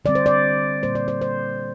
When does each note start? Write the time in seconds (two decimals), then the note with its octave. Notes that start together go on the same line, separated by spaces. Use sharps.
0.05 D3 G3 C4 D5
0.15 C5
0.26 D5
0.83 A#2 G3 A#3 C5
0.95 D5
1.08 C5
1.22 C5